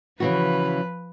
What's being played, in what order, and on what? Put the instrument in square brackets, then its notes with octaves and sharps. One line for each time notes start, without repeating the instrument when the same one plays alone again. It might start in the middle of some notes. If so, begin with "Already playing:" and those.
[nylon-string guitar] C#3 E3 F#4 [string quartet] F3 B4